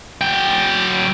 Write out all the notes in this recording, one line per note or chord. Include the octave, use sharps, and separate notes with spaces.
F#3 G5